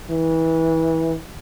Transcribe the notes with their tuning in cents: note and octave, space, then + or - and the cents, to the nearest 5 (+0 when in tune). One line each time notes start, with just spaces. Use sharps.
E3 -25